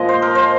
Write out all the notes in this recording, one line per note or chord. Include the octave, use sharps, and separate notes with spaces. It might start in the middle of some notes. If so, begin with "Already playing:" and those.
Already playing: A#2 F3 G#3 D#5
C5
A#4
C5